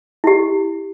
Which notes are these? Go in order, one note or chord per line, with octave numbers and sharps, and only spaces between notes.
E4 G4